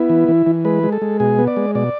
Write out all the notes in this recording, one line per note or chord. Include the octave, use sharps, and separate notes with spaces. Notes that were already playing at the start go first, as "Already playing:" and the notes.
Already playing: B3 E4
E3
E3
E3
G#3 B4
G#3
A4
G#3
B2 G#4
B3
D5
G#3
B2 D5